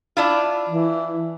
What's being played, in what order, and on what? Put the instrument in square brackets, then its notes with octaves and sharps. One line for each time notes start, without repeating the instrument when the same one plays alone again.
[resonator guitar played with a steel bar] D4 E4 F4
[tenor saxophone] E3